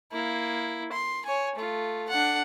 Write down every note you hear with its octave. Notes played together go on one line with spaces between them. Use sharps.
A#3 E4
C6
C#5 G#5
A3 F4
D4 F#5